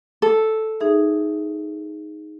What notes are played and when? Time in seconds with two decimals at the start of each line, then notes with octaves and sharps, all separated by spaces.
0.22 A4
0.80 D#4 G#4 E5